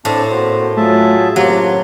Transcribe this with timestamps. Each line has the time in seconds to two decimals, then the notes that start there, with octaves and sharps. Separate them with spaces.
0.05 A2 C4 D4 A5
0.30 A#3 C4 F#4 C5
0.77 F#3 A3 F4 G#4 E5 A5
1.36 F#2 F#3 A#3 C4 F4 G4